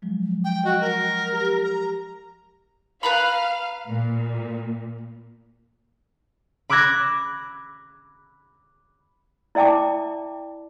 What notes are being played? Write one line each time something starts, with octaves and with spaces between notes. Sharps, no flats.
F3 F#3 G#3
G5
F#4 D#5 F#5
A#4
G4
A#5
B4 F5 A#5 B5
A#2
B5 D6 E6 F#6 G#6 A#6
E4 D5 E5 G5 A5 D6